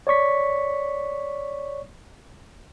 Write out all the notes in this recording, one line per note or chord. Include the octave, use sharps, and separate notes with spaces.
C#5 D5 C#6 B6